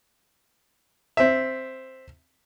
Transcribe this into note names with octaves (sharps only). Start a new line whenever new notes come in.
C4 E5